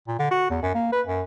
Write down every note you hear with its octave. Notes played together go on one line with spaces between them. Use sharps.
A#2
D3
F#4
E2
F#2
A#3
B4
F#2